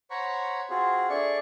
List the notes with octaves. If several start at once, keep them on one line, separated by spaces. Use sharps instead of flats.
C5 C#5 F#5 A#5 B5 C#6
C4 F4 F#4 G#4
D4 G#4 A4 D5 E5 C#6